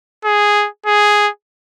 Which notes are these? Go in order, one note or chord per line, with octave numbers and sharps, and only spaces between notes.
G#4
G#4